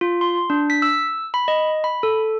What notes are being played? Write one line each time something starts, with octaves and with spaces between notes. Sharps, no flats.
F4
C6
D4
B6
E6
B5
D#5
B5
A4